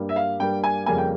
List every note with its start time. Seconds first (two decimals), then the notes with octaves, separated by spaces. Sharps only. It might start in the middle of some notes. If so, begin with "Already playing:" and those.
Already playing: G2 G3 A#3
0.09 E5
0.16 F5
0.39 G2 G3 A#3 G5
0.64 G#5
0.86 F2 C#3 G3 A#3 G#5
0.98 G5